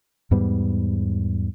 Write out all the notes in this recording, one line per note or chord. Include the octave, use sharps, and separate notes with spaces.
E2 G#2 G3 B3